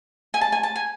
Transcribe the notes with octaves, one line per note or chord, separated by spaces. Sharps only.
G#5
A5
G#5
A5
G#5